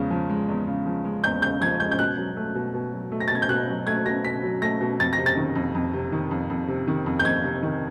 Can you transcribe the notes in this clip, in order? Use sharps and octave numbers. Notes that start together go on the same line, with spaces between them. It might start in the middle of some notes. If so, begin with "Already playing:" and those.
Already playing: E2 C#3 F3 G#3
F3
G#3
E2
C#3
F3
G#3
E2 G6
C#3 G6
F3 G#6
G#3 G6
G6
B2 F#6
F#3
A3
B2
B2
F#3
A3
A#6
A6
B2 G#6
G6
B2 F#6
F#3
A3 G#6
B2 A#6
B2 B6
F#3
A3 A#6
B2
F2 A6
A#6
C3
A6
D#3
F2
F2
C3
D#3
F2
F2
C3
D#3
F2
G6
F2 G#6
C3
D#3